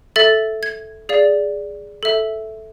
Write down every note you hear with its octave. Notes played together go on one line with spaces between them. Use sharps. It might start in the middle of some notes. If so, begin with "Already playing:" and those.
A4 E5 A6
G#6
G#4 D5 F5
A4 E5